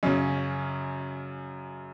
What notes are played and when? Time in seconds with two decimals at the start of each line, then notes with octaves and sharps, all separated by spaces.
0.03 F#2 C#3 C#4